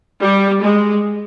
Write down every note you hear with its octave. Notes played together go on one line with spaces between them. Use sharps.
G3
G#3